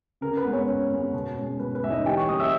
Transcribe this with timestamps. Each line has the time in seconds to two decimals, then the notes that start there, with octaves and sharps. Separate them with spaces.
0.21 C#3 A#4
0.37 B4
0.45 G#3 B3
0.53 C#4 C#5
0.67 C#3
0.91 G#3 B3
1.14 B2
1.37 G#3 C#4
1.59 B2 B4
1.75 B4
1.83 G#3 E5
1.87 C#4 D#4 D#5
2.05 E3 G4 G5
2.17 C#5 C#6
2.29 G3 A#3 C#4 D#5 D#6
2.40 E5 E6